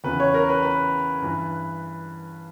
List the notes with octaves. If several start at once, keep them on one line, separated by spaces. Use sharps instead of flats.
E2 C#3 E3 B4
C#5
A#4
B4
B4
G2 E3